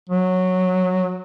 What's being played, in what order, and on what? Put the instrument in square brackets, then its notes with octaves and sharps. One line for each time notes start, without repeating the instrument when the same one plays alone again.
[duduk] F#3